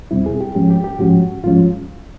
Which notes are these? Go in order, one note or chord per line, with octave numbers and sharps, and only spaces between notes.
E2 B2 G3 C4 E4
G#4
G4
G#2 F3 G#3 C#4 G4
G4
G4
G#2 F3 G#3 C#4 F#4
G#2 F3 G#3 C#4 F4